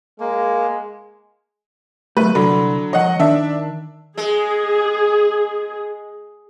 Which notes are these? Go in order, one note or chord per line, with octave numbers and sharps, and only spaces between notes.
G#3 A#3
F#3 A3 B4
C2 D3 F#3 B5
F3 C#5 D#5 F#5
D#3 D4 E5
G#3 G#4